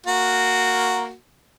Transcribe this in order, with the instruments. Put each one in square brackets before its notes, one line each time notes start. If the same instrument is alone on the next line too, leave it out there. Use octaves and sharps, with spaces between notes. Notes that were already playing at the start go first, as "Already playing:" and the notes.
[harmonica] A#3 F#4